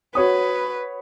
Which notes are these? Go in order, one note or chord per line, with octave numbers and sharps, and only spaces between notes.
F#4 B4 C#5 D#6